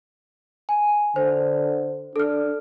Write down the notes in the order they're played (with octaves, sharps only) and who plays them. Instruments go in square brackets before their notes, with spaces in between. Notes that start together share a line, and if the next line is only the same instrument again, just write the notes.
[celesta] G#5
[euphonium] D3 [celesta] C5
[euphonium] D4 [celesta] A4 F6